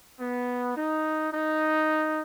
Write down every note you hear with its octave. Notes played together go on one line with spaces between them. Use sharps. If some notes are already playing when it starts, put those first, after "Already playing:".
B3
D#4
D#4